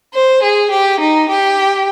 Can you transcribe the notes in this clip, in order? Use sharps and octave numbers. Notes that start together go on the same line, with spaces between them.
C5
G#4
G4
D#4
G4